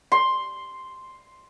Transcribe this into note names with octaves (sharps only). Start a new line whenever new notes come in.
C6